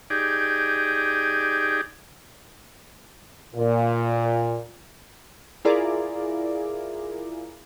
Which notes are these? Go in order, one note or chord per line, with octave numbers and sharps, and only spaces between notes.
D#4 G4 G#4 D5
A#2
E4 F4 G#4 A#4 D5